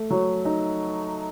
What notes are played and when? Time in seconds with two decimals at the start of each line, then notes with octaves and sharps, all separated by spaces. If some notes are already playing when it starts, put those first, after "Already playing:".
Already playing: A3
0.10 F#3
0.45 D#4